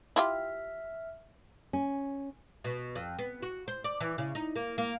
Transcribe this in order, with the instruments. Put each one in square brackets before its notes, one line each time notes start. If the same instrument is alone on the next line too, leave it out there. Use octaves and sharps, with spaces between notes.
[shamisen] E4 F4 G4 [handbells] E5 F6
[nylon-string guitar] C#4
[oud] B2
F2
B3
F#4
C5
D5
E3
C#3
D#4
A#3
A#3